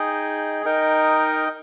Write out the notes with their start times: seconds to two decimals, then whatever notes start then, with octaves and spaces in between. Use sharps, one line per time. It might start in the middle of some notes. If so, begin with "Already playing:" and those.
Already playing: D#4 G#4 D#5 G5
0.65 D#4 A#4 D#5 G5